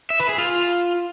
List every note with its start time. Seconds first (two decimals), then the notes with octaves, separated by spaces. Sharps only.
0.10 E5
0.20 B4
0.29 G#4
0.38 F4